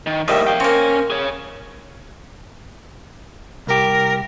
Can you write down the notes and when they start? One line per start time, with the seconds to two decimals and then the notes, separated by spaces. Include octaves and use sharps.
0.07 D#3
0.28 A#1 A2 D#3 G3 E5
0.47 F5 G5
0.60 A#3 C4 C#4
1.10 G#4 C#5
3.67 C2 G4 A#4